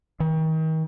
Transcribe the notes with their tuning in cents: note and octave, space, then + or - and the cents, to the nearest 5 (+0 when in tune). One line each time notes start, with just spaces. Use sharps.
D#3 +35